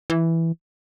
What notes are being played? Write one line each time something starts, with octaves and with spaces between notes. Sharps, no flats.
E3